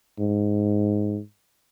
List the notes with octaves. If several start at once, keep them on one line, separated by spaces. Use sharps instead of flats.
G#2